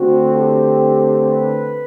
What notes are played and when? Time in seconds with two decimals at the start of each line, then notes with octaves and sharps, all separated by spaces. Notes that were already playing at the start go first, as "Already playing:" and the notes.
Already playing: D3 A3 C4 F#4
0.36 G4
1.29 B4